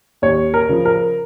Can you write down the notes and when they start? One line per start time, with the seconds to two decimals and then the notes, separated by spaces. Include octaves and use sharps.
0.22 D#2 C#5
0.54 A#4
0.69 C#3 F3
0.85 A#4